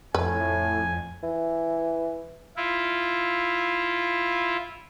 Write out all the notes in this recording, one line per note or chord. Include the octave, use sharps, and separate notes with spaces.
F2 A2 B4 G#5
E3
E4 F4